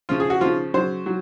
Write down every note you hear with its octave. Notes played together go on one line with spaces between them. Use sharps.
C#3 F3 F4
G#4
F#4
C#3 F3 F4
C#3 F#3 C5
F#3